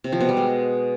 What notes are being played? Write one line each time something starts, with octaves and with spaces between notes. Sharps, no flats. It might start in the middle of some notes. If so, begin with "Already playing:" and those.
C3
F3
B2
G3
G#3